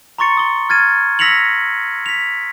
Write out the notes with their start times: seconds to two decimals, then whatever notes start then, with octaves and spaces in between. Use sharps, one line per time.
0.18 A#5 C6 C#6 A6 C#7
0.37 D#6 G7
0.69 F6 G#6 A6 D#7
1.19 E6 A#6 B6 C#7 F7 F#7
2.06 B6 F7